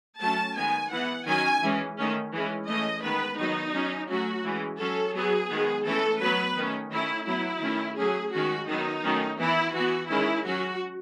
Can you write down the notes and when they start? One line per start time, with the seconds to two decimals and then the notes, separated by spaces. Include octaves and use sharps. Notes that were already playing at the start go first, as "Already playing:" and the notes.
0.21 F#3 A3 C#4 A5
0.56 D#3 G#3 B3 G#5
0.91 E3 B3 F#5
1.27 D#3 F#3 C#4 G#5
1.62 E3 G#3 C#4
1.98 D#3 A3 C#4
2.33 E3 G#3 C#4
2.68 E3 A3 C#4 D#5
3.03 D#3 G#3 B3 B4
3.38 D#3 F#3 B3 D#4
3.74 F#3 C#4
4.09 F#3 A3 C#4 F#4
4.45 E3 G#3 C#4
4.80 F#3 C#4 A4
5.15 F#3 B3 G#4
5.50 D#3 G#3 B3
5.86 E3 A3 C#4 A4
6.21 F#3 B3 B4
6.57 D#3 A3 C#4
6.92 D#3 A3 C#4 E4
7.27 F#3 B3 E4
7.62 D#3 A3 C#4
7.97 F#3 A3 C#4 G#4
8.33 D#3 G#3 C#4 F#4
8.68 D#3 F#3 B3 D#4
9.04 D#3 F#3 A3 C#4
9.39 E3 B3 E4
9.75 E3 B3 F#4
10.10 D#3 G#3 C#4 E4
10.45 F#3 C#4 F#4